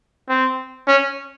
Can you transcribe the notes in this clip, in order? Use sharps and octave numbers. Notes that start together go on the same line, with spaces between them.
C4
C#4